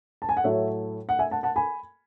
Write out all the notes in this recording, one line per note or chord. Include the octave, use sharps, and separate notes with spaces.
A5
G#5
F#5
A2 F#3 A3 C#5 E5
F#5
E5 G#5
F#5 A5
F#5 A5
G#5 B5